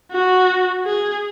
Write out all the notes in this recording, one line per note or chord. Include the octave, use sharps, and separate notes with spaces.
F#4
G#4